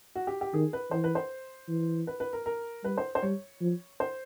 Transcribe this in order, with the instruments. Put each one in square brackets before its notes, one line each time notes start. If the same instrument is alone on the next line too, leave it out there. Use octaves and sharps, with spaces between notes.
[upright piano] F#4
G4
G4
[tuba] D#3 [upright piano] G#4
[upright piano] B4
[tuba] E3 [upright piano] C5
[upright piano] B4
C5
[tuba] E3
[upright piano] B4
B4
A#4
A#4
[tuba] G3 [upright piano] B4
[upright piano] C5
C5
[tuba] G3 [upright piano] C#5
[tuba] F3
[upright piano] C5